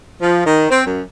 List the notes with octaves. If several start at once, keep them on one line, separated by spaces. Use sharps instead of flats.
F3
D#3
C4
F#2